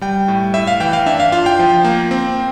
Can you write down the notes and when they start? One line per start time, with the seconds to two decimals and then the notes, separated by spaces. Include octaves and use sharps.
0.01 G3 G5
0.28 A2
0.54 A2 E5
0.67 F5
0.80 E3 G5
0.93 F5
1.06 D4 E5
1.20 F5
1.32 F4 F5
1.46 G5
1.59 F3
1.84 A#3
2.11 C4